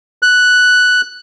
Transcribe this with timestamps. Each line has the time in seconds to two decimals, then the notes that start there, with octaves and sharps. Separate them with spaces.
0.22 F#6